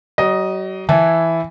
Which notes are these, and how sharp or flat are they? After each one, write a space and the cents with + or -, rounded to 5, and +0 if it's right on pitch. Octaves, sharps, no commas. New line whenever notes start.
F#3 +40 D#5 +0
E3 +0 E4 +0 A5 -10